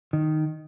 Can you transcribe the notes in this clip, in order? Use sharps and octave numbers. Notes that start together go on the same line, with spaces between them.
D#3